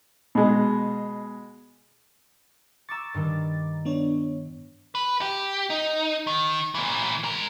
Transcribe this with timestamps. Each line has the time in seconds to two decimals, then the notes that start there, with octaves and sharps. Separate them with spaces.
0.35 B2 G#3
2.89 A#5 C#6 D6 E6 A6
3.14 G2 D#3 G3
3.85 B3 D4 C#5
4.95 B4
5.21 G4
5.70 D#4
6.27 D#3
6.75 A#2 E3
7.24 G#3 A#4